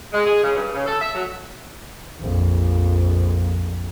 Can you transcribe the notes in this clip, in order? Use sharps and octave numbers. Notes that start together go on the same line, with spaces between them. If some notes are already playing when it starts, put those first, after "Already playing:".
G#3
G#4
C#3
G2
C#3
A4
E5
F#3
A#1 F2